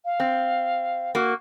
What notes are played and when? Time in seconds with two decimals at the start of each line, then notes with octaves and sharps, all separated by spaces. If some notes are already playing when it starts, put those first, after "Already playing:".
0.05 F5
0.20 C4
1.15 A#3 F#4